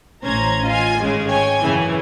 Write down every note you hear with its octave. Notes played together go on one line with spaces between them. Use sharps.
A1 C#4 C5 A#5 G#6
F4 D#5 F5 G#5
G#1 C#3 G#3 G#4
C#5 G5 G#5
F#2 C#3 E3